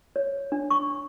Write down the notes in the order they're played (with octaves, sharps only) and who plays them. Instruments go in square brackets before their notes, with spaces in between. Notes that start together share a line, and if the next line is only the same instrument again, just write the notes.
[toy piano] C#5
D4
C#6